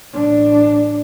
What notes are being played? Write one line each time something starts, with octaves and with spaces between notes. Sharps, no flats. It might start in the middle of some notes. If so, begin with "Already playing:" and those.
A1 D4